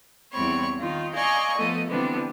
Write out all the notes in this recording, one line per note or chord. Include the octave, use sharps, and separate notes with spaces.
E2 G3 C4 C#5 B5 C#6
D#3 D#4 F4
D5 D#5 F5 G#5 A#5 C#6
F3 A3 B3 A4 D#5
D3 E3 G3 B3 C4 D4